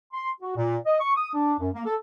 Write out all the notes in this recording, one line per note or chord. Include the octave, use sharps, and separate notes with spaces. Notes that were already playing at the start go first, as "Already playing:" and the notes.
C6
F#4
A#2
D#5
C#6
D#6
D4
F#2
A#3
A4